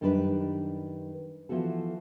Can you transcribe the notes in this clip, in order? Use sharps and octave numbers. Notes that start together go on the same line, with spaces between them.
F#2 D#3 G3 D4 F#4 B4
E3 F3 B3 F#4 A4